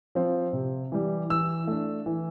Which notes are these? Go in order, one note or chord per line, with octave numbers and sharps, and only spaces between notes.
F3 C4
C3
E3 G3
E3 E6
A3 D4
E3